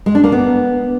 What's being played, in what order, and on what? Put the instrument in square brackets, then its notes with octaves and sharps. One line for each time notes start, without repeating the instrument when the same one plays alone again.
[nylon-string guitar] G#3
D4
A#3
B3